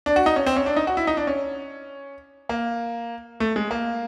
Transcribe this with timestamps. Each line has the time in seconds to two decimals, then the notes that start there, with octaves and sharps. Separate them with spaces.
0.06 D4
0.16 F#4
0.26 D#4
0.36 C#4
0.46 C4
0.56 C#4
0.66 D4
0.76 D#4
0.87 F#4
0.97 E4
1.07 D#4
1.17 D4
1.27 C#4
2.49 A#3
3.40 A3
3.56 G#3
3.71 A#3